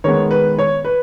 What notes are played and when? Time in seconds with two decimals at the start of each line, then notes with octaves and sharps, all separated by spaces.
0.04 D#3 G#3 B3 C#5
0.31 B4
0.59 C#5
0.85 B4